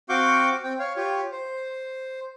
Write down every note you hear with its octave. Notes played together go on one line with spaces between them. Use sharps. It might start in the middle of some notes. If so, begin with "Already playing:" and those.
C4 F#4 F5 C#6 D6 G6
C4 G5
C#5 F5
F4 G4 C#5
C5